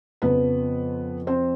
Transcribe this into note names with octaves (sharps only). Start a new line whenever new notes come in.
F2 C#3 F3 B3 B4
C4 C5